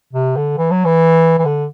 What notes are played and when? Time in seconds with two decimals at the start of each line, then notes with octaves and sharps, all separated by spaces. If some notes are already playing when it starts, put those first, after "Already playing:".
0.13 C3
0.36 D3
0.58 E3
0.71 F#3
0.85 E3
1.38 E3
1.45 D3